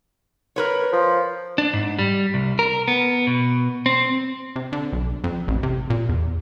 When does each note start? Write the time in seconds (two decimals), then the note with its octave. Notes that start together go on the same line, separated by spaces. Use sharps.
0.56 A#4 B4 C#5
0.93 F3
1.58 D4
1.73 G#2
1.99 G3
2.34 C2
2.59 A#4
2.88 B3
3.27 B2
3.86 C4
4.56 C3
4.73 D3
4.93 B1
5.24 F2
5.48 A1
5.63 C3
5.90 A#2
6.09 E2